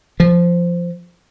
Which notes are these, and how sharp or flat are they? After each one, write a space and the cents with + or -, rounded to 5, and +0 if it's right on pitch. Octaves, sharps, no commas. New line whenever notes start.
F3 -10